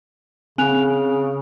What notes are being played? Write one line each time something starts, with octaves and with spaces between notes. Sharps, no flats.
C#3 C4 G#5 F#6 F7